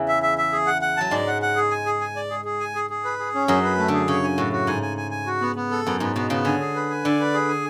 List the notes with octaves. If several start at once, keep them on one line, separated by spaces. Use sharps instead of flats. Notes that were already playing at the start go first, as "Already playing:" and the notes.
Already playing: E2 C#3 E3
E5
E5
E5
G#4
F#5
F#5
F#3 A5
G#2 G#3 D5
F#5
F#5
G#4
G#5
G#4
G#5
D5
G#4
G#4
G#5
G#4
G#4
B4
G#4
C#4
F#2 F#3 G#4
B4
A3
D3 G#4
C#3 C#5
G#5
A2 F#4
F#4
G#2 G#5
G#5
G#5
G#5
F#4
B3
B3
A4
F#2 B3
G#2 B3
B2 B3
C#3 B3
D3 G#5
G#4
B4
G#5
D3 D5
B4
G#4
G#5